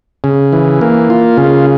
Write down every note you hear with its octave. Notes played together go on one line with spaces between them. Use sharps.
C#3
E3
A#3
F4
C#3